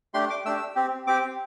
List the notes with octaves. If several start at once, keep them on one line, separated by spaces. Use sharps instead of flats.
A3 D4 G4 C6
D6
A3 D4 G4 E6
C4 G4
C4 G4 D6